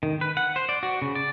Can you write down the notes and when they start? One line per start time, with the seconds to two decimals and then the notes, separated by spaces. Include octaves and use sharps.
0.03 D#3
0.21 B4
0.37 F#5
0.56 C5
0.69 D5
0.83 F#4
1.02 C#3
1.15 D5